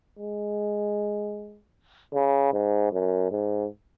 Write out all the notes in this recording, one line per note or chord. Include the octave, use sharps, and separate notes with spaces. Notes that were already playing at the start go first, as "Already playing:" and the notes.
G#3
C#3
G#2
F#2
G#2